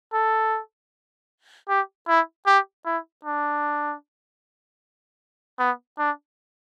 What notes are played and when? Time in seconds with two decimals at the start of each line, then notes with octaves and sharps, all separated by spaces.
0.13 A4
1.69 G4
2.08 E4
2.47 G4
2.86 E4
3.25 D4
5.59 B3
5.99 D4